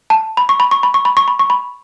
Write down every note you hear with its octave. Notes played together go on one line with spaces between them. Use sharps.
A5
B5
C#6
B5
C#6
B5
C#6
B5
C#6
B5
C#6
B5